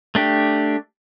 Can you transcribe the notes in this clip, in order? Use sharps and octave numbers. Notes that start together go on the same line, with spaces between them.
A3 D4 G4